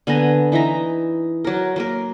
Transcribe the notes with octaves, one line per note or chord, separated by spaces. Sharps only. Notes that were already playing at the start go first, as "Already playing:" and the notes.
D3 B3 G#5 A#5
E3 D#4 E5 A#5
F#3 A#4
F#3 A#3 A#4